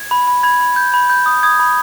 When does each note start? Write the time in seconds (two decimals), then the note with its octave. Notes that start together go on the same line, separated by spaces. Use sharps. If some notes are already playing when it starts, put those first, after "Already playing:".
Already playing: G#6
0.11 B5
0.28 B5
0.43 B5 G#6
0.61 B5
0.76 G6
0.94 B5
1.10 G6
1.26 D#6
1.43 D#6 G#6
1.60 B5